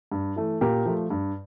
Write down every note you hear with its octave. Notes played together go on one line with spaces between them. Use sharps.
G2
E3 A3
A#2 G4 A#4
F3 A3
G2